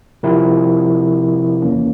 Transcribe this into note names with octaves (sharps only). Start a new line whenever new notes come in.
C3 F3 C4 E4 A#4
E2 E3 A#3 C#4